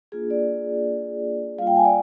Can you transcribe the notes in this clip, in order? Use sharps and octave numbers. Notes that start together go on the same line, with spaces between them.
A#3 D4 F4 G#4
D5
G3 A#3 F4 F5
G5
G#5
D5